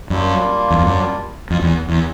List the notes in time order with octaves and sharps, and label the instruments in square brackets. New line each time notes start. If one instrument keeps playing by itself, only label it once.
[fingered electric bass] F#2 [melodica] G3 A#3 D4 F4
[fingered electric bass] E2
F2
F#2
F2
E2
E2